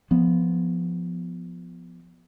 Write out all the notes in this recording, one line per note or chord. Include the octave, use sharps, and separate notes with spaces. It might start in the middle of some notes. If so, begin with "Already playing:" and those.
F3 B3